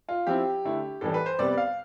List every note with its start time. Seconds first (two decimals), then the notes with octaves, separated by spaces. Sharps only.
0.09 F4
0.27 F3 C4 E4 G4
0.65 D3 A3 E4
1.01 A2 E3 G3 A4
1.14 B4
1.26 C5
1.39 C3 G3 B3 D5
1.58 F5